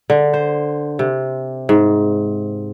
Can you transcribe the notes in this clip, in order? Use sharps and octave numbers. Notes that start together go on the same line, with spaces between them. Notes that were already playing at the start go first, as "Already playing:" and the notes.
D3
C5
C3
G#2